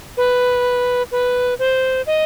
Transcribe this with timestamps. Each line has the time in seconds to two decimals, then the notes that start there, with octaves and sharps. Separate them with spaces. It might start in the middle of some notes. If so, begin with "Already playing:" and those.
0.17 B4
1.12 B4
1.59 C5
2.07 D#5